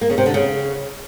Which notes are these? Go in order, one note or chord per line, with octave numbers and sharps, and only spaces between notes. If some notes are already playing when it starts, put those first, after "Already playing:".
A#3
C#3
C3
D3
C#3